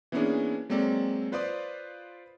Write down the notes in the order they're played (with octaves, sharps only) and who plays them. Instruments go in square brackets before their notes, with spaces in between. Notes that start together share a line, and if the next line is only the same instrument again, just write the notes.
[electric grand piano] E3 A#3 B3 C#4 D4 G#4
F#3 G#3 A#3 C4 A4 D5
F4 B4 C5 D5 F5 D#6